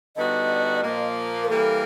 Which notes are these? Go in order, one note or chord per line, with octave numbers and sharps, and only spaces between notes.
D3 G3 B3 D#4 F#4 D#5
A#2 F3 A#3
A#4
E3 G3 A#3 A4